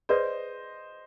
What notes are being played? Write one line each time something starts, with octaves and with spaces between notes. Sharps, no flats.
G#4 B4 C5 D5 D#5